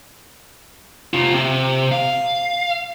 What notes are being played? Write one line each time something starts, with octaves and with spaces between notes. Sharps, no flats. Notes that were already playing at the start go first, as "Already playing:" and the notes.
C3 F4
C3
F5